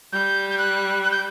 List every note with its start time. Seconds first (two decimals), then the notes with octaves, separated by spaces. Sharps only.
0.12 G3 G6
0.50 G6
0.58 F#6
1.03 F#6
1.11 G6